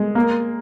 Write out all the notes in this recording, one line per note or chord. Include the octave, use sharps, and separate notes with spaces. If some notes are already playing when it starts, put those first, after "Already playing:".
Already playing: G#3
A#3